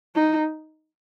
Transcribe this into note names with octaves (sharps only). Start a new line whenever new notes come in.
D#4